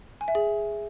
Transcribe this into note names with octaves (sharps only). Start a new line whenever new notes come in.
G#5
E5
G#4